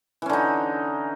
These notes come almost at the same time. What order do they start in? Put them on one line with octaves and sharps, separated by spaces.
E3 C#4 D3 D#4